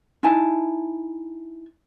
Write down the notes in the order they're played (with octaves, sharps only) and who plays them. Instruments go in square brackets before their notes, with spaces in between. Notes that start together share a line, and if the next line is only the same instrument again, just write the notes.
[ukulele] D#4 E4 G#5 A5